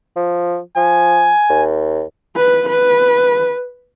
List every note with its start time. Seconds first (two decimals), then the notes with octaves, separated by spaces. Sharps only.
0.16 F3
0.76 F3 G#5
1.50 D#2
2.36 B4
2.69 B4